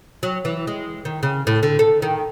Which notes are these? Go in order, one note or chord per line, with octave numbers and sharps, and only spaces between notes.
F#3
E3
G#3
D#3
C#3
A2
D3
A4
D#3